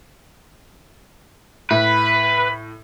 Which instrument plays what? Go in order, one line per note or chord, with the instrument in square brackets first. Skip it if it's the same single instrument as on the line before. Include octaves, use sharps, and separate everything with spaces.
[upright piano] A2 [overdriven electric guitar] B4 [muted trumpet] B5